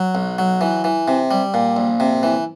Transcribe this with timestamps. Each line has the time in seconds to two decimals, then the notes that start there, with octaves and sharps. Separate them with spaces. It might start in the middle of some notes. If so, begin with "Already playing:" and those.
Already playing: F#3
0.15 B1
0.38 F#3
0.61 E3
0.84 E3
1.08 C3
1.31 G3
1.54 A#2
1.77 A#1
2.00 C3
2.23 E3